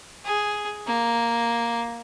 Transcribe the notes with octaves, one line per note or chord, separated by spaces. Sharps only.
G#4
A#3